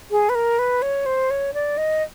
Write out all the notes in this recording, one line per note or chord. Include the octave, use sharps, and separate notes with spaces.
G#4
B4
A#4
B4
C#5
C5
C#5
D5
D#5